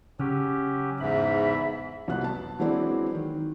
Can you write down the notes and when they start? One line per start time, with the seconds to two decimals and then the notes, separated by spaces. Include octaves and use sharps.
0.20 C#3 F#3 C#4 G4
1.00 E2 G#2 E5 B5
2.08 C2 F2 F3 F#3 B3 F#6
2.24 A5
2.59 E3 F#3 G#3 C4 D4 E4
3.15 D#3